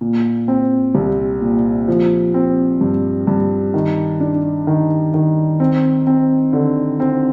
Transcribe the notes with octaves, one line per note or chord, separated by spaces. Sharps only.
A#2
C4
C2
A#2
F3
C4
G2
G2
D#3
D4
D#3
D#3
C4
C4
D3
C4